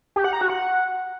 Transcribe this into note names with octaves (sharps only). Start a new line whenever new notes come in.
G4
F#5
A#5
F#4
F#5